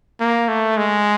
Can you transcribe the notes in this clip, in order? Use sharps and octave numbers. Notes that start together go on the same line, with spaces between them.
A#3
A3
G#3